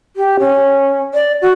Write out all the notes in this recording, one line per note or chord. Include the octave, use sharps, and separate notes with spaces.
G4
C#4
D5
F#4